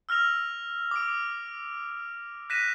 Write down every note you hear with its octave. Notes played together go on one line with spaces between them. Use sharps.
E6 F6 A#6 F7
D6 D7
F#6 A#6 B6 D#7 E7